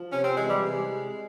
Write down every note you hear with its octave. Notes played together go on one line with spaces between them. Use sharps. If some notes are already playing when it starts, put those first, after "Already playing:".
Already playing: F3
C3 C#4
C4
E3 G#3
G3
C3 G#3